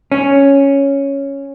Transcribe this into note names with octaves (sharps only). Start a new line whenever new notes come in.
C#4